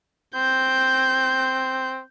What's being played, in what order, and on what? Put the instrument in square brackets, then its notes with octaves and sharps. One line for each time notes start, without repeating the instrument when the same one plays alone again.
[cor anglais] C4 [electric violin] G6